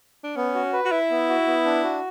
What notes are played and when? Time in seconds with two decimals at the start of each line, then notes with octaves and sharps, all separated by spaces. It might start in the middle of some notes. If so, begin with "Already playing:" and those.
0.24 D4
0.36 B3 C#4
0.54 F#4
0.73 B4
0.85 F#4
0.92 E4 E5
1.10 B3
1.29 F#4
1.47 B3
1.65 D4
1.84 F#4